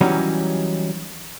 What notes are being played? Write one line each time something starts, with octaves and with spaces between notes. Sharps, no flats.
E3 F#3 G3 C#4 D#4